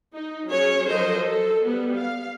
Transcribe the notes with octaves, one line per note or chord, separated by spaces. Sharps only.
D#4
F#3 C#4 G#4 C#5
F3 F#3 A4 A#4 C5 D#5
A4
G3 B3
F5